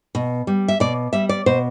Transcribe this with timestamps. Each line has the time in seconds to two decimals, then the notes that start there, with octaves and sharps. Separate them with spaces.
0.15 B2
0.47 G3
0.68 E5
0.80 B2 D5
1.13 G3 E5
1.29 D5
1.46 B2 C5